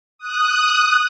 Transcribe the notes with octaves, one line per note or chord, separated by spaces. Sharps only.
D#6 F#6